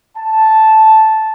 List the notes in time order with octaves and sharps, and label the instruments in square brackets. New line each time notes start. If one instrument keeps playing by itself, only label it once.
[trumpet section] A5